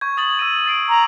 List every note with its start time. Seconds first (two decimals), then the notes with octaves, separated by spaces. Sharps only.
0.01 C#6 G6 G#6
0.17 D#6 A6 F#7
0.39 E6 A#6 D#7
0.66 A6 C7 D7
0.89 A#5